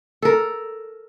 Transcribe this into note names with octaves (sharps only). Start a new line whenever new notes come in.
A4 A#4